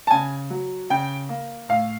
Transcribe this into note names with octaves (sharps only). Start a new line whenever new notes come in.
A5
C#3 G#5
F#3
C#3 G5
A#3
A2 F5